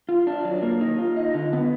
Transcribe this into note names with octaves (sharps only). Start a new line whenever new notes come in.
F4
D4
F#3
A#3
D#4
F4
D#5
D3
B3